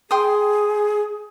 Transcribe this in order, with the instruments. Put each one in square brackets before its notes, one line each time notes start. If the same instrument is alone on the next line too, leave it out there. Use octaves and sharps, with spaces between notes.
[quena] G#4 [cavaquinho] G5 C6 D#6